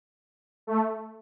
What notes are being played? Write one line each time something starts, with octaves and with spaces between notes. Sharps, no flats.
A3